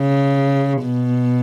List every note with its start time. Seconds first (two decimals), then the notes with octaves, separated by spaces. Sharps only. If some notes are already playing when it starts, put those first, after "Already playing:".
Already playing: C#3
0.83 B2